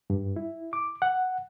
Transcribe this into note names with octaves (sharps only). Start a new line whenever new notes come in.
G2
E4
D6
F#5